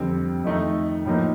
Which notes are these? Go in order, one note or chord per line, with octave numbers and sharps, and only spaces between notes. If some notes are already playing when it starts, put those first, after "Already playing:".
Already playing: F2 D3 G3 C4
F2 D#3 A3 D#4
A2 F3 A#3 D#4